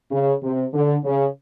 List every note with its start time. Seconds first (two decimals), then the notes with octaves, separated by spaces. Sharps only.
0.11 C#3
0.43 C3
0.74 D3
1.04 C#3